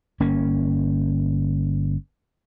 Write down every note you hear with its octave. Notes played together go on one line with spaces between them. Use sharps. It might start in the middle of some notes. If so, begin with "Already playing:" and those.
G1 A#3 C#4